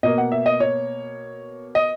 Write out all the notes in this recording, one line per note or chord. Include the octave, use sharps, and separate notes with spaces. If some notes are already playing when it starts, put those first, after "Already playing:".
B2 A#3 D#5
F#5
E5
D#5
C#5
D#5